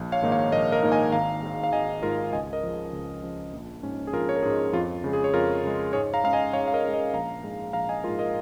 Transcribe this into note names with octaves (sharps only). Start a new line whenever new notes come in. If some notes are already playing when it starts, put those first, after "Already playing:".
Already playing: A#1
C#5 F5
G#2 D#3 A#3 D#4
C#5 F5
A#1 A#4 D#5
A#4 D#5
G#2 D#3 A#3 D#4
D#5 G#5
G#1 F5 A#5
G#2 G#3
F5
G#1 D#5 G#5
G#2 G#3 F4 A#4
C#2 D#5 G#5
A#4 D#5
C#3 F3
C#2
C#3 F3
A#1
G#2 G#3 C#4
G#4
A#1 F4 A#4
C#5
A#4
G#2 G#3 C#4 G#4
F2 F4
C#3 G#3
G#4
C#5
F2 F4 A#4
C#3 G#3
G#2 G#4 C#5
F5 A#5
G#3 C#4 F5
D#5 G#5
G#2 C#5 F5
F5
A#4 D#5
G#3 C#4
A#4 D#5
A#1 F5 A#5
G#2 G#3
A#1 F5 A#5
D#5 G#5
G#2 G#3 F4 A#4
A#4 D#5